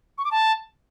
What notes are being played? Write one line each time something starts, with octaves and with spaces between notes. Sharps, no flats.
C#6
D6
A5